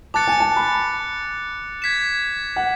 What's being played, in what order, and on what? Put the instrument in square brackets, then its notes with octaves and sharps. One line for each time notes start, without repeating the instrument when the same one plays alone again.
[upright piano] A5 [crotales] D6 F#6 A6 C#7
[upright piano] G#5
A5
B5
[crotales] G#6 B6 E7
[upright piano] F#5